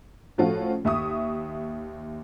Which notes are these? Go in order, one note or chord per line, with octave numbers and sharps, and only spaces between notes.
A2 F3 C#4 F4 F#4 A4
D#2 E5 C#6 D#6